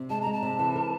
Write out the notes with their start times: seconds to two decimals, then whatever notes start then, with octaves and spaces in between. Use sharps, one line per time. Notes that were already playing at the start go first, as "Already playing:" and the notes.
Already playing: C3
0.10 G#3 A5
0.21 A#5
0.26 G#3
0.33 A5
0.43 C3
0.59 E3
0.76 A#4